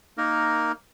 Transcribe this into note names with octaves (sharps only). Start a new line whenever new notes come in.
A#3 D#4 A#4